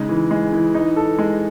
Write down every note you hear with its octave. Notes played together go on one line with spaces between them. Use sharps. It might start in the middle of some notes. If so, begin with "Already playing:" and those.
Already playing: C#3 G#3 D#4
E3
G#3
E3
D#4
A4
G#3